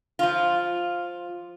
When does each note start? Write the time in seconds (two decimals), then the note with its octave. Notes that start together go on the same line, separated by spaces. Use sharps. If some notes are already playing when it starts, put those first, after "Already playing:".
0.19 F3 F4